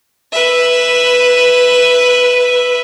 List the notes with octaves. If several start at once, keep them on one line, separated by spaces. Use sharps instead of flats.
B4 E5